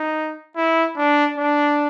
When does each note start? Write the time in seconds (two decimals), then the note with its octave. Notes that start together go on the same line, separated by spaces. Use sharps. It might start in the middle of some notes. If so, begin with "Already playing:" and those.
Already playing: D#4
0.57 E4
0.97 D4
1.38 D4